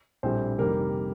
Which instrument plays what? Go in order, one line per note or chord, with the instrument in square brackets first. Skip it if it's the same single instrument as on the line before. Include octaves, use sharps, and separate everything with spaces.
[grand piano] A#1 A2 G3 C4 C5
F1 F2 D#3 G3 A#3 A#4